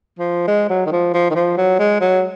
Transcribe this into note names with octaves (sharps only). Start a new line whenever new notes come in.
F3
G#3
F#3
D#3
F3
F3
D#3
F3
F#3
G#3
F#3